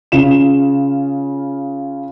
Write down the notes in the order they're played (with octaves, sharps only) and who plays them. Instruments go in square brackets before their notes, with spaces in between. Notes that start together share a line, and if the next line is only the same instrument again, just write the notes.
[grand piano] C#3 F4 E7